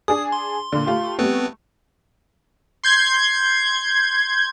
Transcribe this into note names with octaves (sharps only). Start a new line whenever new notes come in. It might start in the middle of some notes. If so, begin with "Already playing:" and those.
D4 G#4 D#6
C6
A#2 D3
A3 F4 G4
G3 A3 B3 C4 B4
C6 G6 G#6